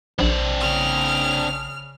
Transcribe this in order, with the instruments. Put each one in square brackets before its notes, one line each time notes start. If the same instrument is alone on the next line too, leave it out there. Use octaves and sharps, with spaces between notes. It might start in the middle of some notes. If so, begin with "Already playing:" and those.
[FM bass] A#1 [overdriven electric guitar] C4 D4
[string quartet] C#3 F6